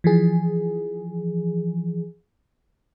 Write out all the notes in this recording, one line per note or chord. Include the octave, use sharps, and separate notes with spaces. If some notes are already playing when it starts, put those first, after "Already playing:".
E3 F3 G#4